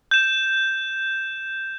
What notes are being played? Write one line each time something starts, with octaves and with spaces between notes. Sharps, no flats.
G6 E7